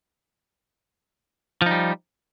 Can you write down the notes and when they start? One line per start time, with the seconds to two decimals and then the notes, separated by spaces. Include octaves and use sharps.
1.62 F3
1.66 D#4
1.71 G3